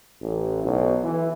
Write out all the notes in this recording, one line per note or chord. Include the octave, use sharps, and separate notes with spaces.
A1
B1
E3